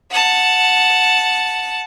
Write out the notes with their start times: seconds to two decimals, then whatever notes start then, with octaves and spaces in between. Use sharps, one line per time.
0.11 F#5 A5